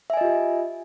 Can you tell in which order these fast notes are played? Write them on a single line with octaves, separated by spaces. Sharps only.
E5 G#5 D#5 F4 G4